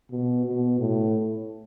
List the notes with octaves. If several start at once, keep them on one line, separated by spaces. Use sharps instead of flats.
B2
B2
A2